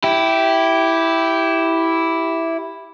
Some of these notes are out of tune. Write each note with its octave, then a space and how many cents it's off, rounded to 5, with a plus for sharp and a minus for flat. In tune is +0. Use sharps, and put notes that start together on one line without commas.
E4 +0 G4 -10